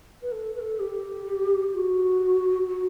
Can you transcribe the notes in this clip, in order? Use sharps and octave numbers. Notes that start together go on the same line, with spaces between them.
B4
A4
B4
A4
G4
F#4
F#4